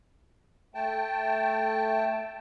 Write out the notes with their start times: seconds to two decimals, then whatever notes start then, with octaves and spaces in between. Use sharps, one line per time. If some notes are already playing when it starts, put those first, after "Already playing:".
0.74 A3 G5 A5